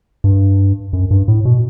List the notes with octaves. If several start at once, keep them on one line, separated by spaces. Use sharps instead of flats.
G2
F#2
G2
A2
B2